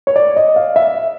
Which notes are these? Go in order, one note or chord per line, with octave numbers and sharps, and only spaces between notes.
C#5
D5
D#5
F5
E5